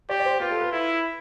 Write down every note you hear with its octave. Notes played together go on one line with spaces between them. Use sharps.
G4 D5
D5
C5
F4 B4
A4
B4
E4